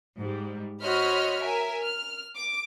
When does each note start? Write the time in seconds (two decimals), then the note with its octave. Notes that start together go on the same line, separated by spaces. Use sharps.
0.18 G#2 G3
0.82 F#4 C5 C#5 D#5 B5 F6
1.41 A#4 E5 G#5
1.81 F6
2.36 D6